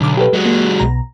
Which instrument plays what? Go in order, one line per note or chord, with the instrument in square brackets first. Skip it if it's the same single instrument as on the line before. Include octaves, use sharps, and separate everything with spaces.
[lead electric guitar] B1 [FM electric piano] D3 D6
[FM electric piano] G4 A4 B4
[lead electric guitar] F#3 G#3
[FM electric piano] A#3
B1 B2 A#5